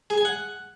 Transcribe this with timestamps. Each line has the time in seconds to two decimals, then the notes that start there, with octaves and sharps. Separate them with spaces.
0.10 G#4
0.18 G#5
0.25 F#5